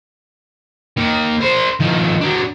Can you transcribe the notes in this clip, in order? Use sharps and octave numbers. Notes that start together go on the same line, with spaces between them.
D#3 A#3
A#4 C5
D#3 F3
F#3 D4